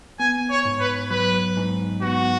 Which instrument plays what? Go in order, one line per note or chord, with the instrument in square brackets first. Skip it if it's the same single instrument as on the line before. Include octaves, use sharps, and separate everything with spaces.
[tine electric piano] B3 [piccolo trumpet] G#5
[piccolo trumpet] C#5
[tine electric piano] G#2
[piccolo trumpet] B4
[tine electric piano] F#3 [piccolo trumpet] B4
[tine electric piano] G#2
[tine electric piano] B3 [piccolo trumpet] F#4